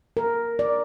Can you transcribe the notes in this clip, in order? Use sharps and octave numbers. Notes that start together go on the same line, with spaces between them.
A#4
D5